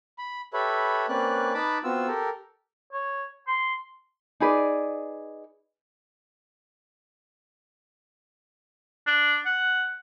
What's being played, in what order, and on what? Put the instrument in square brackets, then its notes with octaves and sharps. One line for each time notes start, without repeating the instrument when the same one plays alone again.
[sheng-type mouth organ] B5
G4 A4 B4 C#5 E5 B5
A#3 C4 C#4 B4 D5 F#6
D#4 B4 A5 B5 D6
B3 C4 F4 F#4 E6
G4 A4 A#4
[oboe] C#5
C6
[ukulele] D#4 G#4 B4 D5
[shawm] D4
F#5